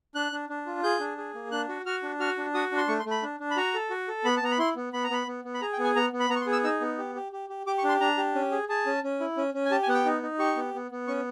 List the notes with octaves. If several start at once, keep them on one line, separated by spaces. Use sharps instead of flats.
D4 F#6
D4
D4
F4
G#4 G6
D4
G#4
A#3
D4 F#6
F#4
F#4 F6
D4
F#4 F6
D4
F#4 D#6
D4
C6
A3 C#6
C6
A3
B5
D4
D4
B5
F#4 A#5
A4
F#4
A4
B3 B5
A5
B3 A#5
B5
E4 C6
B3
B3 B5
A#5
B3 B5
B3
B3
B5
G#4 A#5
G5
B3
G#5
B3 A#5
B3
B5
B3 A#5
C#6
C6
G#4
E6
D#4 E6
B3
G4
G4
G4
G4
G4 D6
C#6
D4 C6
D4 A#5
G4
C#4
G#4
G#4 A5
C#4
C#4
E4
C#4
C#4
G#5
G4 A5
G#5
B3 F#5
G5
D#4
D#4
G4 C#6
B3
B3
B3
C#4 C#6